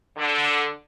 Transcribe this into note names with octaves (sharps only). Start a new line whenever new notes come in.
D3